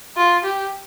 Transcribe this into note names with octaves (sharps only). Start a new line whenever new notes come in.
F4
G4